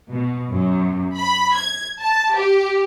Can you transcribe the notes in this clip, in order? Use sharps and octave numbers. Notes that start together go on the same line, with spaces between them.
B2
F#2
B5
G#6
A5
G4